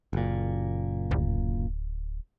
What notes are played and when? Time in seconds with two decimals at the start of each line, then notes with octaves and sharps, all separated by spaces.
0.13 F#1 A#2
1.11 D1